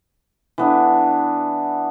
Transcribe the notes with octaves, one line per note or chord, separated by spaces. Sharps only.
E3 B3 D4